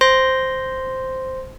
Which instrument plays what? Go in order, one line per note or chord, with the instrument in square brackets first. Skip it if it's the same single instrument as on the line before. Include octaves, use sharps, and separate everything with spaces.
[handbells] C5 C6 A#6